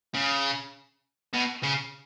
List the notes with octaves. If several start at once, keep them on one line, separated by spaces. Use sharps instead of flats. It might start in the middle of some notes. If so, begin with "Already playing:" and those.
C#3
B2
C#3